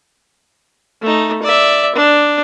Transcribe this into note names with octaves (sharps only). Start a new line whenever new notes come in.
A3 D#4
D5 E5
D4